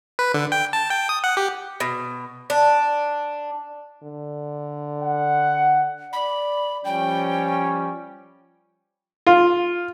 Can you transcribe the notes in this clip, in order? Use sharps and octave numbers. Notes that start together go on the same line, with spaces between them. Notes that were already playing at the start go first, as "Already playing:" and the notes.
B4
D3
G5
A5
G5
D#6
F#5
G4
B2
D4
D3
F#5
D5 B5
F3 G3 C#4 G5
F4